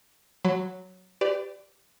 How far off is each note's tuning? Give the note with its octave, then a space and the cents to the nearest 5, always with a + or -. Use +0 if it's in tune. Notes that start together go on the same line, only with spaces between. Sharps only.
F#3 +0 B5 +35
G4 +0 B4 +40 D5 +0